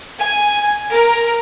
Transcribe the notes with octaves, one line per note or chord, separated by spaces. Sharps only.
G#5
A#4